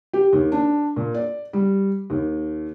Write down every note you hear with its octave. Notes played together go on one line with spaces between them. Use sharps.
G4
D#2
D4
A#2
D5
G3
D#2